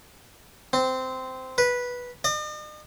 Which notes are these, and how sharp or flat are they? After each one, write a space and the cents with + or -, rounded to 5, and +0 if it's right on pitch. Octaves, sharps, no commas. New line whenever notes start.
C4 -15
B4 -10
D#5 -45